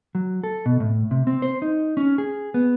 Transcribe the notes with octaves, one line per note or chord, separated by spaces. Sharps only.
F#3
A4
B2
A2
C3
C4
C5
D#4
C#4
G#4
B3